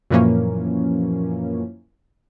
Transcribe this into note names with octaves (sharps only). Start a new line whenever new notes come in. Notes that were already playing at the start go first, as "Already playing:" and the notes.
F#2 A#2 E3 F3 A#3 C#4